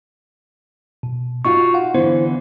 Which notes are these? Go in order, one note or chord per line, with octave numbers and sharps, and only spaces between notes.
B2
D#4 F4 F#4 C#6
F5 F#5
D3 E3 B3 E4 C5